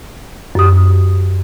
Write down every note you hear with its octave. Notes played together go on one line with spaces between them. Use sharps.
F#2 G4 D#6